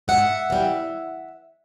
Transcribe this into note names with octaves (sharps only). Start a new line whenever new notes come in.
G#2 E5 F#5
E3 G3